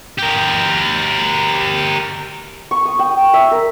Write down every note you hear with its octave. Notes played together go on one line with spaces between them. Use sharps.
G4 A#4
C#6
D#6
G5
E5
A#4